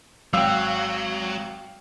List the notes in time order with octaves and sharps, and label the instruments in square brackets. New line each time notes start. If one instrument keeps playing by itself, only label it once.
[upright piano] G#1 E6 [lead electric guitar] F#3 [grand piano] F5 G5